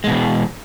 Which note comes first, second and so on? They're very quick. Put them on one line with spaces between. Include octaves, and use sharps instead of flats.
G#3 B2 E3